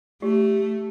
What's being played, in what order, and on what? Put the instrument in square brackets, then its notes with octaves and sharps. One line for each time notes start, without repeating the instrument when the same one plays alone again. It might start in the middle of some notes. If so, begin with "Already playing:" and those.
[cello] A3 [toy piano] G4